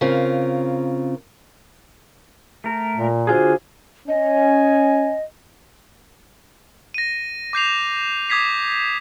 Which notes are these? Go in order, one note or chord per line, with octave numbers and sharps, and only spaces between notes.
C#3 C4 F4 A#4
A3 A#4
A#2
D3 F4 F#4 G#4 C5
C#4 D#5 G#5
A#6 D#7
D6 G6 C7 F7
D6 D#6 G#6 B6 C7